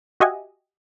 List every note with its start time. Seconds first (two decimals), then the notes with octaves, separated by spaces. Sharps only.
0.20 F#4 G4 D#5 E5 F#5 G#5